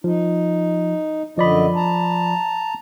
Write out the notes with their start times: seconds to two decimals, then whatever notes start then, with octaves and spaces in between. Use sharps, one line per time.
0.04 F3 D#4
1.37 F#2 D3 F3 D5 D#5 B5
1.76 A5 A#5